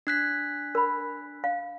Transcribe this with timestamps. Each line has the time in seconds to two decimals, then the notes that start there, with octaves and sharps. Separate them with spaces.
0.07 D4 F#6 B6
0.75 A#4 B5
1.44 F5